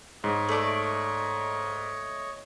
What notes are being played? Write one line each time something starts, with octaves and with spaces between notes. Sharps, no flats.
G#2 C#5 D#5
A3 D5